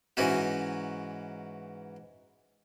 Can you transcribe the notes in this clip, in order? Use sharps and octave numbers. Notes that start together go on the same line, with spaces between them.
G#2 E3 C#4 D#4 F#4